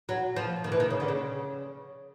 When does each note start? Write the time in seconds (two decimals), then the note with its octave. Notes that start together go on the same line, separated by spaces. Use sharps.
0.09 F#3
0.36 F3
0.64 D#3
0.72 E3
0.80 D#3
0.90 C#3
1.00 D3
1.08 C#3